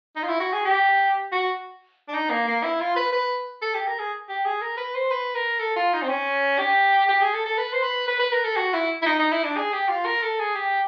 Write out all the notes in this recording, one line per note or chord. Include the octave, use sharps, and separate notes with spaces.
D#4
F4
E4
F#4
G#4
G4
F#4
D4
D#4
A#3
A#3
E4
F4
B4
B4
A4
G4
A#4
G#4
G4
G#4
A#4
B4
C5
B4
A#4
A4
F4
D#4
C4
C#4
G4
G4
G#4
A4
A4
B4
C5
B4
B4
B4
A#4
A4
F#4
E4
E4
D#4
D#4
E4
D4
G#4
G4
F4
A#4
A4
G#4
G4